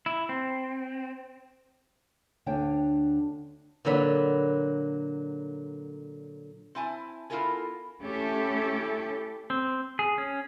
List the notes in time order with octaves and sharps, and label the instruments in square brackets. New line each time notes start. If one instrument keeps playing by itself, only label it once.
[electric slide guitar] E4
C4
[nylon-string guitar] D2 D3 D4 C#5 G5
[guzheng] A#2 D3 F#3 B4 B5
[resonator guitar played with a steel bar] C4 E4 G#5 A5
B3 E4 F4 A4 A#4 G#5
[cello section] A3 C#4 E4 G4 A4
[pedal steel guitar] C4
G#4
C#4